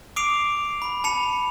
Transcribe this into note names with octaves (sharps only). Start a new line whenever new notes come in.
D6 D#6 C7 D7 F7
B5
A5 B5 C#7 F7